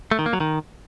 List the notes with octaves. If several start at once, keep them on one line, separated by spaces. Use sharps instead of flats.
A3
D#3
A#3
F#3
D#3